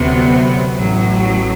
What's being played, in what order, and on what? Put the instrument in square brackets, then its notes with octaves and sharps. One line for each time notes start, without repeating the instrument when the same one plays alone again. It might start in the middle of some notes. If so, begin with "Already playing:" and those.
Already playing: [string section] D2 C3 F#3 B3
A1 A2 F#3